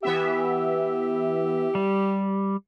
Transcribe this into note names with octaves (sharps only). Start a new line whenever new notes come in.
E3 B3 G4 E5
G3